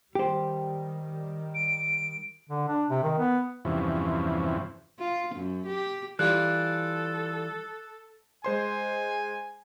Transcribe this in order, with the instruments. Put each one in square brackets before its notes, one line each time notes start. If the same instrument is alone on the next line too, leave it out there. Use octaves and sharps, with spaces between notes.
[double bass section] D#3 G3 [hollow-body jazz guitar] G4 C5
[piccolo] D7
[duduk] D3
D4
C3
D#3
B3
[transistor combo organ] E2 G2 C3 E3 F3 C#4
[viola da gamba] F4
F#2
G4
[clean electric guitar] E3 [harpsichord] G3 F4 G4 [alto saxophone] A4 [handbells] F#6
[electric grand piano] G#3 C5 C6 [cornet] G#5